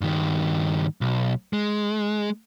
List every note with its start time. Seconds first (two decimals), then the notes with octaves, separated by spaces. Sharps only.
0.01 G2 D#3
1.01 B1
1.53 G#3